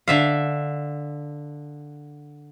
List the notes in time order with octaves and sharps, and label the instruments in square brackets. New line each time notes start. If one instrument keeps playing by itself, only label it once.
[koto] D3 E5 F5